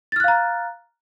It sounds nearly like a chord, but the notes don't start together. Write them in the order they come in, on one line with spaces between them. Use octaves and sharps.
A6 F6 F#6 F5 A#5